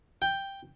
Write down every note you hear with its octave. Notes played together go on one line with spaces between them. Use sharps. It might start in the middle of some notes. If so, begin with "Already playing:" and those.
G5